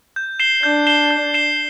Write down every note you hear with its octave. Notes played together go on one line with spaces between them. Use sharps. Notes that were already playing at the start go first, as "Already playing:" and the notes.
G6
C7 E7 G7
D4 G6
C7 E7 G7
G6
C7 E7 G7